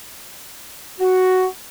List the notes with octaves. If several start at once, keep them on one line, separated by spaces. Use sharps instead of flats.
F#4